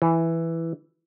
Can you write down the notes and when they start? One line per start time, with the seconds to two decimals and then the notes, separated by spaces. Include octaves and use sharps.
0.02 E3